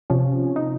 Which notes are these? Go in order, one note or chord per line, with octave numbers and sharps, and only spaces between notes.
C3 F3 C#4
D#4